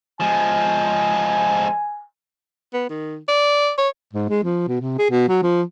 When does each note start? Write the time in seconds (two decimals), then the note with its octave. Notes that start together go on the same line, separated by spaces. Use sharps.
0.20 F3 G#3 G#5
2.73 B3
2.89 D#3
3.28 D5
3.78 C#5
4.13 G#2
4.29 G#3
4.43 F3
4.68 B2
4.81 C3
4.98 G#4
5.10 B2
5.29 F#3
5.43 F3